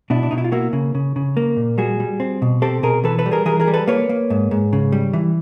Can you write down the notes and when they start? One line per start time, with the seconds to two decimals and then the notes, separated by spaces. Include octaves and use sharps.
0.10 B2 D4 E4
0.23 D4
0.31 B2 D#4
0.38 E4
0.44 F4
0.52 A#3 E4 F#4
0.73 C#3
0.95 C#3
1.16 C#3
1.37 A#3
1.57 A#2
1.78 G3 F#4 G#4
2.00 G3
2.20 C4
2.42 B2
2.62 C4 G4 A4
2.83 B2 G#4 A#4
3.04 E3 A4 B4
3.18 A4 B4
3.26 G3
3.32 G#4 A#4
3.46 E3 G#4 A#4
3.60 G#4 A#4
3.67 G3
3.74 A4 B4
3.88 A#3 B4 C#5
4.09 A#3
4.30 G#2
4.51 G#2
4.73 C#3
4.92 G3
5.13 E3